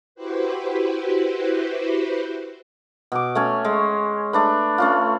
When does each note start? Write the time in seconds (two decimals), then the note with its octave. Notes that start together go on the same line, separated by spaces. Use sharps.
0.15 E4 F#4 G4 B4 C5
3.12 B2 D6
3.35 A3 C#4 C#5 G#5
3.65 G#3
4.33 A3 D4 B4
4.78 A3 C#4 F4